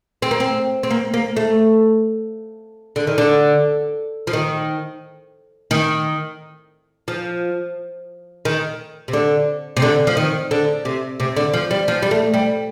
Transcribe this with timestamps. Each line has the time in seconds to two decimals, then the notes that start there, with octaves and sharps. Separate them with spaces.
0.22 C4
0.31 A#3
0.40 C4
0.83 C4
0.91 A#3
1.14 A#3
1.36 A3
2.96 D3
3.07 D#3
3.18 D3
4.27 F3
4.33 D#3
5.71 D#3
7.08 F3
8.45 D#3
9.08 C3
9.13 D3
9.77 C3
9.82 D3
10.07 F3
10.17 D#3
10.51 D3
10.85 C3
11.20 C3
11.36 D3
11.54 F3
11.71 G3
11.88 F3
12.02 G3
12.11 A3
12.34 G3